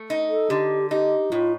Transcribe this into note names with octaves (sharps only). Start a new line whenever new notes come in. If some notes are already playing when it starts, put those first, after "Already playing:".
Already playing: A3
D#4
A4
D3 G4
D#4 G4
A2 F4